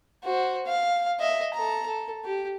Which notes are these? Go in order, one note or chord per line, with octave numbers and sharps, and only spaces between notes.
F#4 C5
F5
D#5 E5
A4 A#5
A4
G4